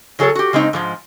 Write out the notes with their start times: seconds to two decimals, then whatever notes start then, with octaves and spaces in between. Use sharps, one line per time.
0.19 C#3 F#3 G#4 A4 C#5
0.35 F#4 G4
0.53 C#3 G#3 C4 D#4
0.73 G#2 F3 G#3